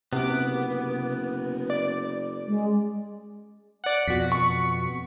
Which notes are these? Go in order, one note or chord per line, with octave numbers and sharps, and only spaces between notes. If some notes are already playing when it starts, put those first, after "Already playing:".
F#1 C3 B3 D6
D5
G#3
D5 F#5
F2 B2 F#4 B6
C#6